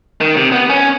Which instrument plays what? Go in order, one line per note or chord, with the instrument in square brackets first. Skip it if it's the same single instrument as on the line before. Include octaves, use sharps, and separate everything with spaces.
[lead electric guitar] D#3
C3
B3
C#4